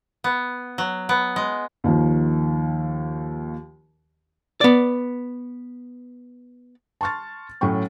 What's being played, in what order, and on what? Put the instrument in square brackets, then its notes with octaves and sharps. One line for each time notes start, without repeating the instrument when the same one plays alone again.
[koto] B3
F#3
B3
G#3
[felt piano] D#2 D#3 F3
[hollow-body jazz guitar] B3 D5
[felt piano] A5 C6 C#6 F6 A6
A2 F#3 C#4 G5 C#6